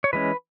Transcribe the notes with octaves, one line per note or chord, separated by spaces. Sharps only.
C#5
E3 G#3 C#4 B4